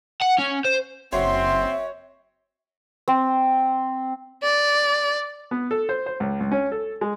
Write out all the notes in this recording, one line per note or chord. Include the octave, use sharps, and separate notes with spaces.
F#5
C#4
C5
F#1 C4 F#4 C#5 E5 C6
C4
D5
B3
A4
C5
C5
C#2
C#2
C#4
A4
G#3